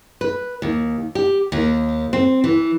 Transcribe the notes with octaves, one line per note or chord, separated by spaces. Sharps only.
B4
D#2
G4
D#2
C4
E3